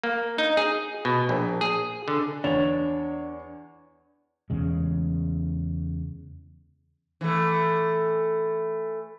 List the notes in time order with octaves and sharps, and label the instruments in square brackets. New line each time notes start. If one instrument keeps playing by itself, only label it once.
[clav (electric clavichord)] A#3
D#4
G#4
B2
A#1
G#4
D3
[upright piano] E2 C#5 F7 [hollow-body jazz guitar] D4
[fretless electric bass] E2 C#3 G#3
[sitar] E3 A3